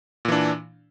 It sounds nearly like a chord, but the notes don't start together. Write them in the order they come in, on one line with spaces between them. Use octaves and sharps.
A#2 E3 D4